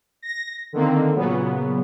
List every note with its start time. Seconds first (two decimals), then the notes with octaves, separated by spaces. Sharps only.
0.22 A#6
0.73 D3 D#3 A#3 C4
1.16 A#2 C#3 F#3 B3